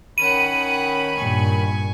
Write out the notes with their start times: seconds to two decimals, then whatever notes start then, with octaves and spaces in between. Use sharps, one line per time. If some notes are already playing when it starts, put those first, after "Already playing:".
0.18 D#3 C#4 F#5 B5 D#7
1.16 G2 A#2 G#5 C#6